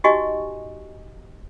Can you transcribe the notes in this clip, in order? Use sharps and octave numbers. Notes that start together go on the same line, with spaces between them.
D#4 F#4 G4 D#5 G#5 C#6